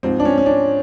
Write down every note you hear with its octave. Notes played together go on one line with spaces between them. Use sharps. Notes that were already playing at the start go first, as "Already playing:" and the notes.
G#2 F3 C4
D4
C#4
C#4
D4